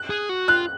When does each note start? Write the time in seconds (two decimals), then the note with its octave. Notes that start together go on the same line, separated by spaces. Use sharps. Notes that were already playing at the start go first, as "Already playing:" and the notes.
Already playing: F#6
0.10 G#4
0.29 F#4
0.48 F4 F#6